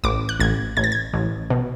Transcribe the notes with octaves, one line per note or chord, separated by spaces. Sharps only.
A1 D6
F#6
A1 G#6
A1 G#6
A6
G#6
A1
B2